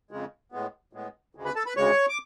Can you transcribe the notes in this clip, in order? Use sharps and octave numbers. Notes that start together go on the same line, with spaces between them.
F2 C#3 G#3
A2 G#3 B3
A2 G#3 B3
D2 C#3 G#3
B4 B5
A4 A5
B4 B5
D2 C#3 G#3 C#5 C#6
D6